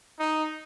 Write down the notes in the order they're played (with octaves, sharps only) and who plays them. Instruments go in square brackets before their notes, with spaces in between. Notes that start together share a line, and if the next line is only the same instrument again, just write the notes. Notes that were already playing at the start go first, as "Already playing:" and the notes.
[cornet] D#4